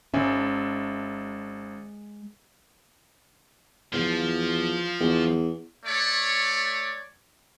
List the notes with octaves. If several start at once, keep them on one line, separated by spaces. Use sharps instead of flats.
G#1 G#3 C#4 E5
E2 F3
E2
A3 C#5 D5